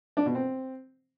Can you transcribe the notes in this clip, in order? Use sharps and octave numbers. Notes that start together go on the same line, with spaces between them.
D4
B2
C4